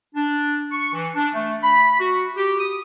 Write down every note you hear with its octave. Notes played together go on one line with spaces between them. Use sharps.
D4
C#6
E3
D4
A3
B5
F#4
G4
D#6